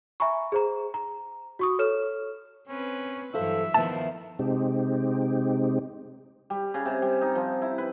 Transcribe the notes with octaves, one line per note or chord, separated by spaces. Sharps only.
E5 G#5 A#5 B5 C#6
G#4 C5 A#5
A#5
F#4 C#6 D#6
A4 C#5 F6 E7
C4 C#4 B4
G2 E3 F#3 A4 C5 E5 F5
D#3 F3 B3 E4 C5 A5
C3 G#3 C4 D#4 G4
G3
C#3
C3
G3
D#4
F3
E4
B4